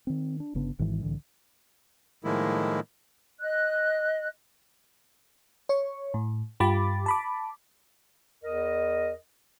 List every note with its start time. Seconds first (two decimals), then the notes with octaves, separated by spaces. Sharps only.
0.07 D#3 C4
0.40 D4
0.55 G1 C#3 B3 D4
0.79 G#1 G#2 D#3 E3
1.01 C2 A2 D3 E3
2.24 A2 D#3 F3 G#3 A#3 E4
3.40 D#5 F#6
5.69 C#5 C#6
6.14 A2
6.60 G2 F4 G4 B5 D6 A6
7.06 A5 B5 D6
8.43 E2 A#4 D#5